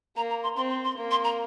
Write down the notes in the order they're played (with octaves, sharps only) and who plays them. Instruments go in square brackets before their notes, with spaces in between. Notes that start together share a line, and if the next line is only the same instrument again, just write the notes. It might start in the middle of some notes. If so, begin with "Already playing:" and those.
[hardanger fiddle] A#3 [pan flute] A#5
[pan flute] A#5
C6
[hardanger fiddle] C4 [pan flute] C6
[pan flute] C6
C6
[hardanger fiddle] A#3
[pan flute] C6
A#5